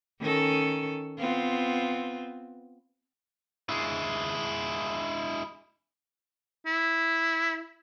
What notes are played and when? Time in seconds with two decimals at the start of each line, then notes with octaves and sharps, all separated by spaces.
0.20 D#3 C#4 A4
1.19 B3 C4 F4
3.69 G#3 E4
6.66 E4